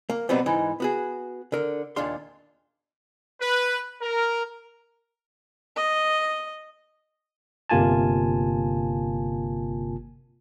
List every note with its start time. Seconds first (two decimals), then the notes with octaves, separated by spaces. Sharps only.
0.10 A#3
0.29 B2 F#3 G3 B3 C4
0.46 G#2 E3 D#4
0.80 B3 F#4 G#4
1.52 D3 A#4
1.96 D#2 A#2 D4 F5 C6
3.41 B4
4.02 A#4
5.76 D#5
7.70 G1 C3 A#3 F4 G#5 A5